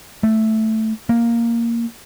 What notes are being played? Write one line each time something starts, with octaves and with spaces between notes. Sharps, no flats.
A3
A#3